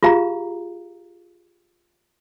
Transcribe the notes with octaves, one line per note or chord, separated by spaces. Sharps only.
F4 G4 G#4 F5 A#5